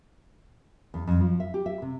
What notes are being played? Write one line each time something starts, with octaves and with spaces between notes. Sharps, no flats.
E2
F2
F3
E5
G4
E5
C3